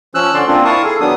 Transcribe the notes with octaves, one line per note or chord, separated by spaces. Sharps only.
F3 C#4 E6 F#6
D3 C#4 D5 C6
A#3 C4 D4 F4
E4 A#4 F5 A5 C#6 D#6
G#4 A4
D#3 F#3 B3 D4 D#6